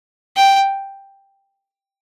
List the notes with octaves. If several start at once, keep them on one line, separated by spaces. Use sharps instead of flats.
G5